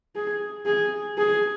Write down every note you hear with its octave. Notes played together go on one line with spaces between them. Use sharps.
G#4
G#4
G#4